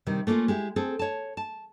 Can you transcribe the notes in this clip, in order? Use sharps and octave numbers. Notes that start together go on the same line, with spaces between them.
C3 D#3 G3
A3 A#3 C#4 D4 F4
G#3 E4 G4
C4 G#4 A4
C#5 A5
A5